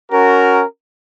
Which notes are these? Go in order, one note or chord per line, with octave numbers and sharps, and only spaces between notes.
C#4 F#4 A#4